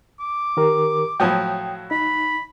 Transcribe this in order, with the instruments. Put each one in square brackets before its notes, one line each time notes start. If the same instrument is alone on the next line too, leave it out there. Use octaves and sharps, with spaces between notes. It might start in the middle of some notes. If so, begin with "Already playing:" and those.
[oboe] D6
[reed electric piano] D#3 G4 A#4
[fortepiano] A2 F3 F#3 [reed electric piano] G5 D#6
[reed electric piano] D#4 [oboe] B5